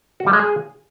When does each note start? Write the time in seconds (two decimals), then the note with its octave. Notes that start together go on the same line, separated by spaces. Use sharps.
0.20 F#4
0.27 G3
0.33 G#3
0.39 G#4